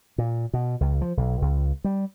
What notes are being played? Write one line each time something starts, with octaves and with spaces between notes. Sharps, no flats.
A#2
B2
C#2
F3
B1
C#2
G3